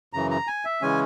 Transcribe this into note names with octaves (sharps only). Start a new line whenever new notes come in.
F#2 C#3 E3 A#5
A#5
G#5
E5
C#3 E3 G#3 C#4 G#5